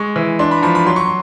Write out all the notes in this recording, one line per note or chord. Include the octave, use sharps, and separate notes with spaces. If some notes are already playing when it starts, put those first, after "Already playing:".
Already playing: G#3 C#6
E3
D4 C6
B5
A#5
F3 B5
B5
F#3 C6
C#6
C6